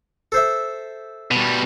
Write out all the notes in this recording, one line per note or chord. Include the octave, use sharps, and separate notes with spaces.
A4 C5 E5
B2 G3